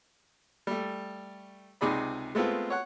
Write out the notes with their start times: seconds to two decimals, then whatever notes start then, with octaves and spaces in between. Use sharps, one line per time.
0.67 G3 A3
1.81 C#2 C3 D#4 G#4 D5 B5
2.35 G#3 A3 B3 C4 F4
2.70 C#5 F#5